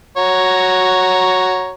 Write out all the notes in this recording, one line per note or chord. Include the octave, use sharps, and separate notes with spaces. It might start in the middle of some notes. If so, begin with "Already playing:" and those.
F#4 C#5 A#5